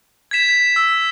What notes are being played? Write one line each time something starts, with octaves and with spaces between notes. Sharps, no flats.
G#6 B6 E7
E6